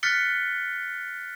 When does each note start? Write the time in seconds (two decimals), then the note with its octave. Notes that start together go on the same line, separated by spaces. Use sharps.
0.03 F6 F#6 A6 B6 C#7 G7